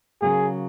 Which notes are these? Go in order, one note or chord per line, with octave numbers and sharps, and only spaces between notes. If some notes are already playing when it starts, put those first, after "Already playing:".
C#3 F#3 A#3 G#4